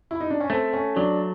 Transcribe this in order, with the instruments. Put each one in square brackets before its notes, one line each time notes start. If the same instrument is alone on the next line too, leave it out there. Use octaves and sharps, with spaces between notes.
[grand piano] E4
D#4
D4
C#4
[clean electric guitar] A3 [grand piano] C4
[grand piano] C#4
[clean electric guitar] F#3 [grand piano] D4